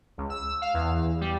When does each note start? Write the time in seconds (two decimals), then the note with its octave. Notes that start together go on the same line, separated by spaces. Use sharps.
0.18 C#2
0.30 E6
0.62 F5
0.74 E2
1.21 G3